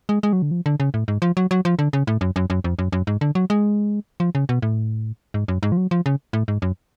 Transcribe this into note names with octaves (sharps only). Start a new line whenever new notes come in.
G#3
G#3
F#3
D3
F3
D3
C#3
A2
G#2
F3
F#3
F#3
F3
D3
C#3
A2
F#2
F#2
F#2
F2
F#2
F#2
G#2
D3
F#3
G#3
F3
C#3
B2
A2
G#2
F#2
G#2
F3
F#3
F3
C#3
A2
G#2
F#2